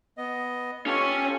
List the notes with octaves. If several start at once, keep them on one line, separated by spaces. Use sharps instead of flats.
B3 D#5
C#4 F4 G4 A4 C#5